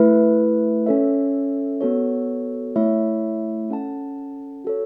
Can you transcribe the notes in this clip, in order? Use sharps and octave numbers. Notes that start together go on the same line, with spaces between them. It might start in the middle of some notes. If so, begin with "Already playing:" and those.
Already playing: A3 E4 B4 E5
C#4 A4 C#5 E5
B3 F#4 A4 C#5
A3 E4 C#5 E5
C#4 A4 F#5 A5
F#4 A4 C#5